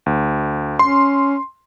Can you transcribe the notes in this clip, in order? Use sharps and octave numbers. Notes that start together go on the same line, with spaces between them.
D2
C#4 C6